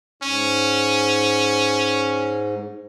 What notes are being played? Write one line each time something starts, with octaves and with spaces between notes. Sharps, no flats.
G#2 C#4